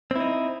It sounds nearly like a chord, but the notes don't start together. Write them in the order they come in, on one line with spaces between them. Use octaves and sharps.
C4 E4 D#4